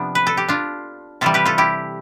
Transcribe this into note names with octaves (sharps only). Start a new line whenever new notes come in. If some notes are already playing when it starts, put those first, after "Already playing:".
Already playing: C3 F3 B3 D4
B4
A4
G4
D4 F4
C3 E3 G3 F4 A4
G4 B4
F4 A4
E4 G4